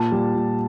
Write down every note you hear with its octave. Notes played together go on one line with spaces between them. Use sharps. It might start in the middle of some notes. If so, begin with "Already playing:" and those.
Already playing: A#2 A5
G3
A#2